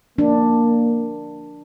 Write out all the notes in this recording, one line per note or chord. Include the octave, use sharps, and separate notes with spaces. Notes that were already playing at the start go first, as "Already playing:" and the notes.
F3 A#3 D4